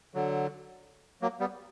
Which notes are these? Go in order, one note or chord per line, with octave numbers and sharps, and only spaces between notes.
D3 F#3
F#3 A#3
G3 B3